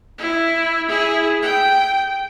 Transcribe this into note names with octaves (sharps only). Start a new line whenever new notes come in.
E4
E4 G#4
G5